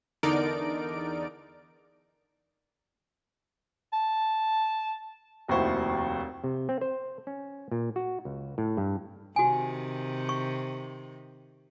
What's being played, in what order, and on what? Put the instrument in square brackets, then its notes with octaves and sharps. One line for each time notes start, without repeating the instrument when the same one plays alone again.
[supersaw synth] E2 D3 D#4 A#4 D5 D7
[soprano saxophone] A5
[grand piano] F1 D#2 E4 F#4 C5 C#6
[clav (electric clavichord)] C3
C4
C5
C#4
A#2
F#4
C#2
A2
G2
[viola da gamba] C3 D#3 [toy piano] F#4 G#5
[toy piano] C#6